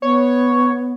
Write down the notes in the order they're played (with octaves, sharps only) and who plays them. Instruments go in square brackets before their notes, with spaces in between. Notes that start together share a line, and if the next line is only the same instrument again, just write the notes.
[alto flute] B3 [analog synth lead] C#5